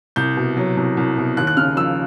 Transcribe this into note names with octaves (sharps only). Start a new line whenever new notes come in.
C2 G6
B2
F#3
C2
C2
B2
D#2 F#6
F#6
C#3 F6
F3 E6